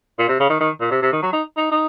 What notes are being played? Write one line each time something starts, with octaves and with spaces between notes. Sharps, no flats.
A#2
C3
C#3
D#3
D#3
A#2
C3
C3
D#3
F#3
D#4
D#4
D#4